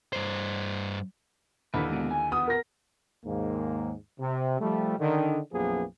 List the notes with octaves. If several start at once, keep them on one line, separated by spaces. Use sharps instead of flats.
G2 C5
D#2 D3 E3 B4
G#2 B2
G#5
B3 D#6
A#4 A#6
D#2 G#2 A#3
C3
F3 G3 A3
D3 D#3
B1 F#2 F3 A#3 B3 G#4